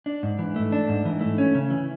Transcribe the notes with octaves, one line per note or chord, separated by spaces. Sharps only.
D4
G#2
E3
A3
D4
G#2
E3
A3
C#4
C#3
E3